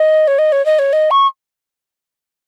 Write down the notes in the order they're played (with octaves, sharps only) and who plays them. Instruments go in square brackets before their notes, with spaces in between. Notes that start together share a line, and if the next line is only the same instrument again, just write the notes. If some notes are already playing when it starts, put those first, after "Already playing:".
Already playing: [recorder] D#5
C#5
D#5
C#5
D#5
C#5
D#5
C#6